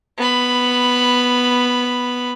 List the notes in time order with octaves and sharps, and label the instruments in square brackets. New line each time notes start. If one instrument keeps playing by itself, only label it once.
[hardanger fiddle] B3 B5